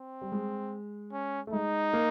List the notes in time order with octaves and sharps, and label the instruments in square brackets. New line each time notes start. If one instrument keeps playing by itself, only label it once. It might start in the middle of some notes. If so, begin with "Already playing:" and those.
Already playing: [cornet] C4
[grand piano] G3
G#3
[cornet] C#4
[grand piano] A3
[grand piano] G#3 [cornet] D#4
[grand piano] A#3